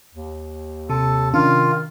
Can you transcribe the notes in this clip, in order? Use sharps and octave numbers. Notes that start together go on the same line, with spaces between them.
D#2
C3 A4
C3 D#3 C#4 D4 F4